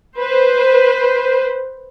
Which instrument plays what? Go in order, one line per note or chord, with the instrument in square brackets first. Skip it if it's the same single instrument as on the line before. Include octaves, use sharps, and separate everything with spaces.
[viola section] B4 C5